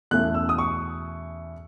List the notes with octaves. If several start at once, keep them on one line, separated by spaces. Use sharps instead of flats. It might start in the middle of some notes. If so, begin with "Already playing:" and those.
E2 B2 A3 C#4 E4 F#6
E6
D#6
C#6